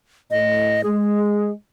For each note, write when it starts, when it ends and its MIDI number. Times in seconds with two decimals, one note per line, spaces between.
0.31 0.79 45
0.31 0.81 75
0.83 1.50 56
0.83 1.50 68